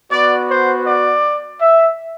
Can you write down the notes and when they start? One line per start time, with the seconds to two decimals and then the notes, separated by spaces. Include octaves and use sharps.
0.11 B3 F#4 D5
0.48 C5
0.86 D5
1.60 E5